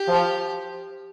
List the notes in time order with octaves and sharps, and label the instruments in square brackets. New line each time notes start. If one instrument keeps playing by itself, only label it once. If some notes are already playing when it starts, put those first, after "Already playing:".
Already playing: [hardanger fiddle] G4
[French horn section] F3